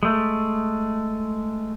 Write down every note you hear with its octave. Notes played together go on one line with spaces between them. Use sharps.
G#3 A3